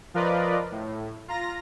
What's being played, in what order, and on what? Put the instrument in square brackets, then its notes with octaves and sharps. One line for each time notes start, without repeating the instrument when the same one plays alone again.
[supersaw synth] F3 F4 A#4 B4 D5 D#5
A2
F4 A#5 A#6